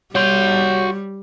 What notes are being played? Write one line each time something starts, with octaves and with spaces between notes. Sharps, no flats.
G3 F#4 C#5 C6 G6